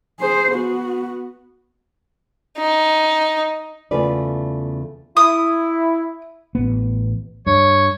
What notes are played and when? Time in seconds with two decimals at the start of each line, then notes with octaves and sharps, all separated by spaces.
0.20 G#4 C5
0.51 B3 F#4
2.58 D#4
3.91 E2 C#3 A3 F4 B4 D5
5.17 E4 D#6
6.55 A1 B3
7.47 G2 C#5